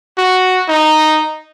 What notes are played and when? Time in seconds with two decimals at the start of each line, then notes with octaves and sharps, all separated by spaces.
0.18 F#4
0.68 D#4